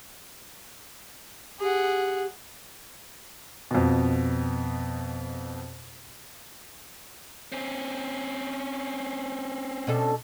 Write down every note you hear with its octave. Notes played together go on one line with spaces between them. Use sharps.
G4 G#4 F#5
F2 B2
C4 C#4
B2 D4 A4